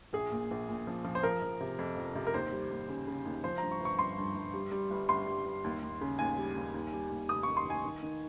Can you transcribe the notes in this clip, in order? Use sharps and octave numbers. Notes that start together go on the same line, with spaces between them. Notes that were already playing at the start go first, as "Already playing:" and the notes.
A#1 G#4
A#2
A#1
A#2
F3
F3
C5
F3 A#4
F3
C3
F2
F3
C3
A#4
D#2 C5
G3
D#2
C#3
C#3
D#2
F3 C5
G2 A#5
C#6
G1
C#6
G1 C6
G2
G1
G3
G3
G1
G1 C6
G3
G1
D#2
D#2
C#3
D#2 G#5
G3
D#2
D#2
G3
D#2
F1 D#6
D#3 C#6
C6
D#3 G#5
D#3
D#3